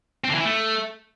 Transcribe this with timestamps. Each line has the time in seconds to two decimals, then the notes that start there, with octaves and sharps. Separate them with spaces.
0.24 C4
0.29 D3
0.35 E3
0.40 E4
0.45 A3